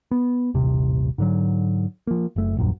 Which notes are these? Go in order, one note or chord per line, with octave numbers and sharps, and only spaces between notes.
B3
D#1 A1 C3
G#2 D3 F#3
F3 A#3
F#1 A3
D#1 A#1 F#2